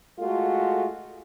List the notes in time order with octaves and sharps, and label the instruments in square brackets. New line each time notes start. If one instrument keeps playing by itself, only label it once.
[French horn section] G#3 A3 F4 F#4 A4